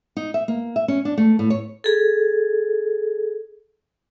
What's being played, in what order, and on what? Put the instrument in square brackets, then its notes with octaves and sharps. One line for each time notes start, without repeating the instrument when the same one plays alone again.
[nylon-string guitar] D#4
E5
A#3
E5
C#4
D4
A3
A2
C#5
[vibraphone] G#4 A4